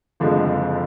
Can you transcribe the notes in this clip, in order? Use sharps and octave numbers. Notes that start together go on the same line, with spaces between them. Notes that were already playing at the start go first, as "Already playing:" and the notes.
F#1 F2 D3 F3 G#3